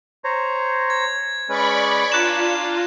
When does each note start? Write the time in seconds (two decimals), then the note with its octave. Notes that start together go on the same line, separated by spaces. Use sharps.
0.24 C5 C#5 A#5
0.90 G#6
1.49 G#3 C#4 B4 D5 B5 C#6
2.12 D4 F4 A#5 F#6 E7